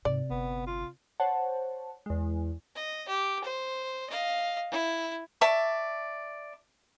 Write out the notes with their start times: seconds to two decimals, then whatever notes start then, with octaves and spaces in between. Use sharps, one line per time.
0.05 G#2 C3 D5
0.30 G1 B3
0.67 F4
1.20 C5 C#5 F#5 A5
2.06 E2 G#3
2.76 D#5
3.08 G4
3.44 C5
4.09 D#5 F5
4.71 E4
5.41 D5 E5 A5 C#6